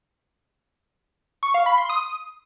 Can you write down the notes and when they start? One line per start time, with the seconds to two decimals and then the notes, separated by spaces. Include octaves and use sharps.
1.43 C#6
1.54 F5
1.66 B5
1.78 C6
1.89 D#6